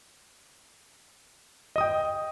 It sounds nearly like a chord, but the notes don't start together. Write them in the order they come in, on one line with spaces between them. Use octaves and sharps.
D#5 D#6 G5